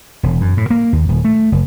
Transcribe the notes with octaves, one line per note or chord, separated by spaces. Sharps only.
E1
F#2
A2
A#3
D#2
D#1
A3
F#1